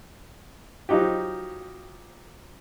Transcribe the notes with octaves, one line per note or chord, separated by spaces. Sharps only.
F3 F#3 D#4 F#4 G4